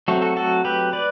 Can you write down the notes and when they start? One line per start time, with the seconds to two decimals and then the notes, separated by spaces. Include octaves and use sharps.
0.08 F#3 A3 C4 F#4 A4
0.22 F#4 A4
0.37 F#4 A4
0.65 G4 B4
0.93 B4 D5